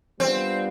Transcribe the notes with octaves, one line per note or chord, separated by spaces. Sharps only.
G3 B3 C4 D4 F4